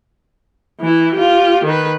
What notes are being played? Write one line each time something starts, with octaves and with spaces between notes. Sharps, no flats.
E3 E4
F4 G4
D#3 B4